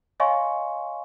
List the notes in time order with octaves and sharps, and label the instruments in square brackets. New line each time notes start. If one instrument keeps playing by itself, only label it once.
[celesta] C#5 D#5 F5 G#5 C6 C#6